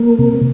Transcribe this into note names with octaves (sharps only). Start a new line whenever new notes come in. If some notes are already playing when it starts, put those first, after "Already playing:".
Already playing: A#3
C3